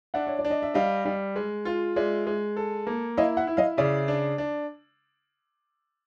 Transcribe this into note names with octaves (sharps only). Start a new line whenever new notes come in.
D4 E5 F#5
C#5
D5
D4
D#5
E5
G3 D#5 F5
G3
G#3
F4
G#3 D5 E5
G#3
A4
A#3
E4 D#5 F5
E5 F#5
E4
D#5 F5
C#3 D5 E5
D4
D4